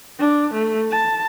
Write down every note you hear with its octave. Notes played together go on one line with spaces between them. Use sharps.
D4
A3
A5